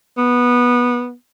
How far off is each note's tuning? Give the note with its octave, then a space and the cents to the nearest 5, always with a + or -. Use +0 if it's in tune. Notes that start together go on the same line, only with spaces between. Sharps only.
B3 -15